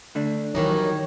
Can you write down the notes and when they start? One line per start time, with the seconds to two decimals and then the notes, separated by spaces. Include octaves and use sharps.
0.15 D3 A3 D4
0.55 D#3 E3 F#3 G3 D#4 C#5